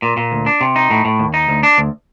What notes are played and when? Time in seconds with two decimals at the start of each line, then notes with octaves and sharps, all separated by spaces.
0.02 A#2
0.17 A#2
0.32 D2
0.46 D4
0.61 C3
0.76 D#4
0.90 A2
1.05 A2
1.20 D#2
1.34 D#4
1.49 D2
1.63 D4
1.78 D2